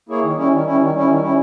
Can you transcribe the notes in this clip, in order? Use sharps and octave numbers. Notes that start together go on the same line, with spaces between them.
A#3 E4 G#4 C#5
D#3
G3 C#4 E4
D#3
G3 C#4 E4
D#3
G3 C#4 E4
D#3
G3 C#4 E4